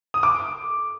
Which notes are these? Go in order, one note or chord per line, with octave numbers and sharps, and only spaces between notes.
D#6
D6